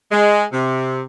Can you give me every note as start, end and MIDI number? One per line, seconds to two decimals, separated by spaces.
0.11 0.44 56
0.52 1.00 48